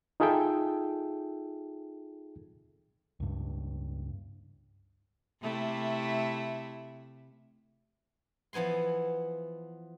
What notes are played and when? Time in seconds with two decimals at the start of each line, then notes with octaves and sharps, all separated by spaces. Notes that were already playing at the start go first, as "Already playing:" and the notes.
0.20 D#4 F4 G#4 A4 E5 G5
3.20 C#2 G2
5.42 C3 A3 E4
8.53 E3 F3 B3 G#5 C6